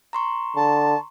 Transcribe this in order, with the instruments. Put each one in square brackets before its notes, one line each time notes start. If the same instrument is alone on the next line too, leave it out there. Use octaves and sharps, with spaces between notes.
[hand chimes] A#5 C6 C#6
[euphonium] D3 [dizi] A5